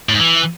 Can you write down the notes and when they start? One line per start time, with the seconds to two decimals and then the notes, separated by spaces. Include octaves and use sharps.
0.09 A2
0.15 G#2
0.20 E3